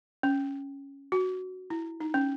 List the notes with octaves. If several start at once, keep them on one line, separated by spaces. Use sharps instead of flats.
C#4
F#4
E4
D#4
C#4